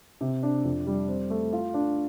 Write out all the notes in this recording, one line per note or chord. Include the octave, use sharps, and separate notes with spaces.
C3
D4
F2
G3
C4
A3
F4
D4